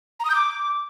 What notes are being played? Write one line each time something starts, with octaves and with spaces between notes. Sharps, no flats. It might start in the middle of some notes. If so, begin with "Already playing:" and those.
A#5
D#6
G6
D6